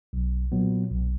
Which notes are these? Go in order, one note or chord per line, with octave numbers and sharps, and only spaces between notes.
B1
A#2 F#3 B3
B1